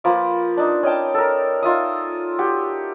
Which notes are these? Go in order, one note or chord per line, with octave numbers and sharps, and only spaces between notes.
F3 A#3 B4 D6
D4 D#4
C#4 D#5 G5 A5
A4 A#4
D#4 F4 E5 D#6
F#4 G4